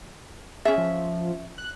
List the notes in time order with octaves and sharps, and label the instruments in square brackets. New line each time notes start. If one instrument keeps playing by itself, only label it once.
[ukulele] C#4 E5 [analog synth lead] G#4
[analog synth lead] F3
F#6